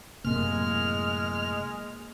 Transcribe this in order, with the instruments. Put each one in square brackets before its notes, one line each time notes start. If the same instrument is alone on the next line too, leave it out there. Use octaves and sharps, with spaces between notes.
[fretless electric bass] F#2 A2 C3 [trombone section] G#3 [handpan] A#3 [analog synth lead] F6